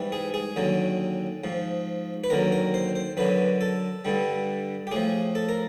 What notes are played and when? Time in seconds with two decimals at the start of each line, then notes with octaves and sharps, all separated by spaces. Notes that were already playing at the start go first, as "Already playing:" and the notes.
Already playing: G#2 E3 G3
0.12 G#4
0.34 G#4
0.56 D#2 D3 F#3
1.44 G#2 F3
2.24 B4
2.30 D#2 D3 F#3 A#4
2.52 A#4
2.74 C5
2.95 C5
3.17 F#2 D3 F#3 B4
3.61 A4
4.05 G2 D3 G3
4.87 G4
4.91 A2 F3 G#4
5.35 A4
5.49 A#4